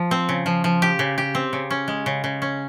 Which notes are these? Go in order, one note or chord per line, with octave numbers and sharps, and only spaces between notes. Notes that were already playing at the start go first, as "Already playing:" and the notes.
Already playing: F3
C4
C#3
F3
F3
G4
C#3
G4
C4
C#3
C#4
G#3
C#3
C#3
C#4